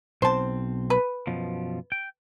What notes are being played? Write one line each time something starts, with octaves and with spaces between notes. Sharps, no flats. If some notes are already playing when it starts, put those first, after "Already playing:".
B1 C4 C5 A5
B4
F#2 B2 F3
G5